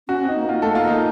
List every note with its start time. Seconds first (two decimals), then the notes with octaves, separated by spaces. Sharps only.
0.08 C#4 F#4
0.22 C4
0.28 D#4
0.36 A#3
0.49 F4
0.62 A3 A4
0.75 A#3 F4
0.88 D#4